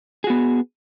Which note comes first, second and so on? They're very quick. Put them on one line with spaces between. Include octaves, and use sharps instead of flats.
G#4 F#4 B3